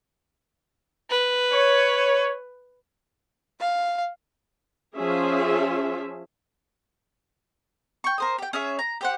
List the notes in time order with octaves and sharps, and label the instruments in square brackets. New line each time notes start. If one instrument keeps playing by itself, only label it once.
[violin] B4
[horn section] C#5
[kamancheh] F5
[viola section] F3 C#4 F4 G#4 E5
[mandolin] G5 C#6
A#4 C5 D#6
G4 G5
C#4 G#4 C#5 E5
A#5
G4 C5 F#5